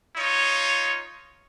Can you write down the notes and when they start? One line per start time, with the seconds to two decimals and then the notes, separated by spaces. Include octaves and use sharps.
0.17 D#4 F4 C#5